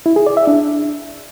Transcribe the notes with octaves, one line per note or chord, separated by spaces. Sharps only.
E4
G#4
D5
E5
D4